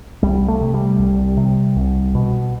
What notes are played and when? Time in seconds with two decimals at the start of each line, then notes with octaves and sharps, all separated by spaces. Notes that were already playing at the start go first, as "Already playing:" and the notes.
0.23 C2 G3
0.48 A3
0.61 C3
0.74 G3
0.99 C2
1.37 C3
1.76 C2
2.15 B2